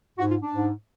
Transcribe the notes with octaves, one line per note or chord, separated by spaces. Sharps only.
G#2 F#4
F4
D4
G#2